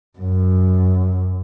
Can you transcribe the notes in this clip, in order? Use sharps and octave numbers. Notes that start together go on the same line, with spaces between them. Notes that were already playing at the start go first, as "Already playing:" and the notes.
F#2